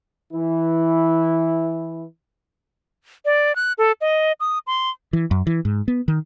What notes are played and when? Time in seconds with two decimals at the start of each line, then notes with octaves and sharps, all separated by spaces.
0.33 E3 E4
3.25 D5
3.56 F#6
3.78 A4
4.01 D#5
4.40 D#6
4.67 C6
5.13 E3
5.31 F#2
5.47 E3
5.65 G#2
5.88 B3
6.08 D#3